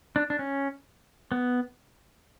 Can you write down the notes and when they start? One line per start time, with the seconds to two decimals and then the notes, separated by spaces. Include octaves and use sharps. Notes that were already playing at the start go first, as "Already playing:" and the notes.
0.16 D4
0.30 D4
0.39 C#4
1.32 B3